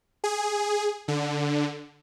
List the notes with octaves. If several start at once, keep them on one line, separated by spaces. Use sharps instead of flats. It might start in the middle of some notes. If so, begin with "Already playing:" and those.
G#4
D3